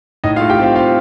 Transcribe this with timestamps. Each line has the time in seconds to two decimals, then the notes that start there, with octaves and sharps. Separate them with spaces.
0.24 A2 D#4 D#5
0.36 F4 F5
0.41 A3
0.50 G4 G5
0.58 C4 F4 F5
0.76 C4 F4 F5